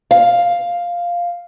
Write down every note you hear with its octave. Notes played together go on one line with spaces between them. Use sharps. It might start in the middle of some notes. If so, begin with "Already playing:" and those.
F5